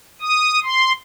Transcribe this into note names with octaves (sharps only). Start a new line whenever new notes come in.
D#6
C6